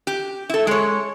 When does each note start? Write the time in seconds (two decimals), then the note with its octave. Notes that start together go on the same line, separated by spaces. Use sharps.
0.07 G4
0.50 E4 A4
0.67 G#3 C#5